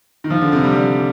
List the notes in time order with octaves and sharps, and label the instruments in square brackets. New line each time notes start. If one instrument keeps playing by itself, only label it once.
[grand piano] D#3
F3
D3
C3
G3
G3